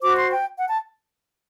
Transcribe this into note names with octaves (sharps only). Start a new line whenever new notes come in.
F#4 C5 D6
C6
G5
F#5
A5